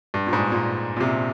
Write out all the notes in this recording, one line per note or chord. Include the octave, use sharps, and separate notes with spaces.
G2
A#2
G#2
A#2
A#2
C3